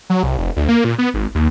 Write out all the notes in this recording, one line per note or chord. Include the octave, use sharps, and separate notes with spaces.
F#3
C2
F1
D2
A#3
A#2
B3
G#1
D#2